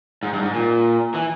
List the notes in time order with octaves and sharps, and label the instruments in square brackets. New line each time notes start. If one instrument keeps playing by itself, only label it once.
[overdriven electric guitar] G#2
G2
G#2
A#2
E3